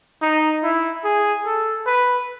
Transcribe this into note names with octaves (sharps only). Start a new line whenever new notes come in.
D#4
E4
G#4
A4
B4